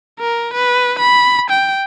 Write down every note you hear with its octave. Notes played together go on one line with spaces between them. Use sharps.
A#4
B4
B5
G5